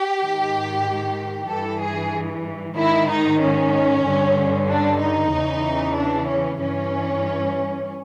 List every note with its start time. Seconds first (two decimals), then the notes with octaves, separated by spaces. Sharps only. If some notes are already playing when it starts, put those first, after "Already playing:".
Already playing: G4
0.21 G#2 D#3
1.49 G2 E3 A4
1.81 G#4
2.77 G#2 D#3 E4
3.09 D#4
3.41 C#4
4.05 G2 D3
4.69 D4
5.00 D#4
5.33 E2 C#3 E3
5.96 D4
6.28 C#4
6.60 G2 E3 C#4